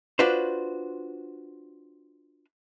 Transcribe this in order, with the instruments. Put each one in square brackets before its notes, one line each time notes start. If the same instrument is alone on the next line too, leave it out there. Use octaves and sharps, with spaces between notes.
[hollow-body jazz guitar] D4 F4 F#4 B4 C5